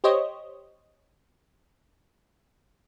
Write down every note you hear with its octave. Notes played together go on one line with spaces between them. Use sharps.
G4 C5 C#5 D#5